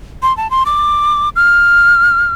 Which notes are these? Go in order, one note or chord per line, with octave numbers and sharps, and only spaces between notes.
C6
A5
C6
D6
F6